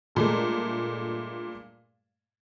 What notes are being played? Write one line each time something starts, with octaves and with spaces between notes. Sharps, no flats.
G2 A#2 G#3 A3